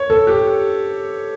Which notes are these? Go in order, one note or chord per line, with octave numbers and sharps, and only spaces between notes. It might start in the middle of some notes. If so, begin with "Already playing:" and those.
Already playing: C#5
A4
G4